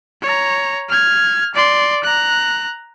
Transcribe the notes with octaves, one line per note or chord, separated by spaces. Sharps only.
C#5 A#5
F6 G#6
D5 C6
A#5 F#6